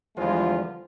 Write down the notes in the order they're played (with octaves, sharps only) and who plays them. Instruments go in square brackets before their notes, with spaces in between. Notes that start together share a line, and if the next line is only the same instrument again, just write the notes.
[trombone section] E2 D3 F3 G3 G#3 F4